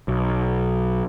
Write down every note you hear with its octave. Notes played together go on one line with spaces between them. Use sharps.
B1